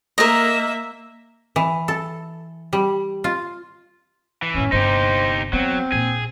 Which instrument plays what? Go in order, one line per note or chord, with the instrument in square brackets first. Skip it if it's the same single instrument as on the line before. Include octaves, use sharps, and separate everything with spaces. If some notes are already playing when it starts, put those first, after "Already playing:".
[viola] A#3 E5 [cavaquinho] A#4 D#5
[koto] E3
A4
G3
F4
[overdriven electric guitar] E3
[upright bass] F#2 A2 [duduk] C#4
[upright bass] G1 C3 [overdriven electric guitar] D#4 G4 [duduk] C5
[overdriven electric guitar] F#3 [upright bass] B3 [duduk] C4
[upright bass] A#1 A#2 [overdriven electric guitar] G#4